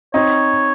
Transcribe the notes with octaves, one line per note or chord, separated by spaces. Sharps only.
C4 D#4 C#5